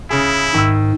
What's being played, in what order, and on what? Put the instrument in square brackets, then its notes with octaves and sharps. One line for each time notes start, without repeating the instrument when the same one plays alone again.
[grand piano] C#3 G#4 [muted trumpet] E4
[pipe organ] G#2 [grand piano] D#3 E6